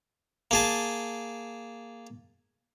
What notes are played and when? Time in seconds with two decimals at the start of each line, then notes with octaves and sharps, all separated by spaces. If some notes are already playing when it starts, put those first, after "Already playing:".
0.51 A#3 G#4 A5